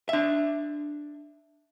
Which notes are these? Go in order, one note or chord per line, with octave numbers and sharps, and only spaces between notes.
D4 E5